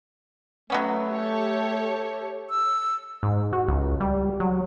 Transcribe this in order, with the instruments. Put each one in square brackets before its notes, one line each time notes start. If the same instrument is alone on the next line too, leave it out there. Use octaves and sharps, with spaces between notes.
[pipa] F#3 B3 C#4 [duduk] A3
[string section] G4 A4 C#5
[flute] E6
[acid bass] G#2
F#4
C#2
G3
F#3